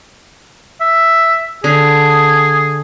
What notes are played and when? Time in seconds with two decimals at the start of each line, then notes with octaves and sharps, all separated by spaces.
0.81 E5
1.64 D3 G#4